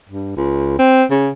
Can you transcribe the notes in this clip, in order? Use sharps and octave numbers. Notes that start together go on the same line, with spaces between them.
G2
C#2
C4
C#3